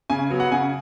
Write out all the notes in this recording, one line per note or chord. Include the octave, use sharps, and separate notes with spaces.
C#3 G#5
F#3 B3
F#5
C#3 G#5